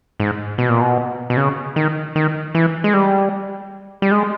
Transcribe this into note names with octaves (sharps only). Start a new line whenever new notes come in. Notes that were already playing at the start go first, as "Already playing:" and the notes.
G#2
B2
A#2
B2
B2
C#3
D#3
D#3
E3
G#3
G3
G3
G#3